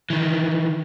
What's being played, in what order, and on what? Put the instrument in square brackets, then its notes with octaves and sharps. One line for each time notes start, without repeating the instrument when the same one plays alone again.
[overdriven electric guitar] D#3 E3